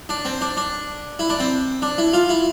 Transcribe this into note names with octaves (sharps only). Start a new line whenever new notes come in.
D4
C4
D4
D4
E4
D4
C4
D4
E4
F4
E4